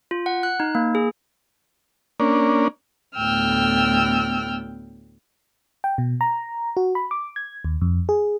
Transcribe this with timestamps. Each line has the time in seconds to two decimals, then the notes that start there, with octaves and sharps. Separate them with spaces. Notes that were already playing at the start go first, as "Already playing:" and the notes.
0.11 F4
0.26 F#5
0.43 F#6
0.60 D#4
0.75 A#3
0.95 G#4
2.20 A#3 C#4 D4
3.14 D2 A2 B3 G5 E6 F6
5.84 G5
5.98 B2
6.21 A#5
6.77 F#4
6.95 B5
7.11 D6
7.36 G#6
7.65 D#2
7.81 F2
8.09 G#4